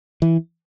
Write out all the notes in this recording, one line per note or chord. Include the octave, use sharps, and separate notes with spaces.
E3